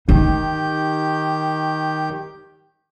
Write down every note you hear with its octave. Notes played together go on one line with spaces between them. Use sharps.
D#3 D#4 G4 G6